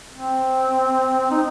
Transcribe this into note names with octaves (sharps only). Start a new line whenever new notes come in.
C4
D#4